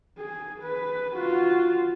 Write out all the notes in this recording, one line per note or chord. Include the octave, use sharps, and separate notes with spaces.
G#4
B4
F4 F#4